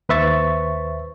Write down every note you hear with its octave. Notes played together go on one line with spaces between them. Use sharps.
D#2 B4 C5 E5 C#6 A6